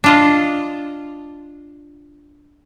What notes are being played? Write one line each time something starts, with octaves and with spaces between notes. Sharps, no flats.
D4 F4 D#5